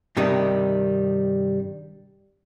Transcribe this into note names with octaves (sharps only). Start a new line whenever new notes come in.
G2 C3 D#3 G3 D#4